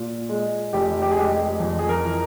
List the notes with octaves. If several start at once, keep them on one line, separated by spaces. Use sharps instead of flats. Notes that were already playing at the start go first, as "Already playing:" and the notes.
Already playing: A#2
G#3
F1 G4
G4
G#4
G#3 G4
F2
G#4
A#4
E3